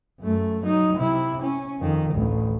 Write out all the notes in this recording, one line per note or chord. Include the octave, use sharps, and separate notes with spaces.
F#2 A3
F#3 D#4
C3 E4
C#4
F2 D#3
A1 D2